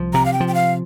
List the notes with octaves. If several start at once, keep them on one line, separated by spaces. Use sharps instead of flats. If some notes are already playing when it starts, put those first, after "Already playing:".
Already playing: C2 F3
C3 A#5
F5
G5
F3
G5
F5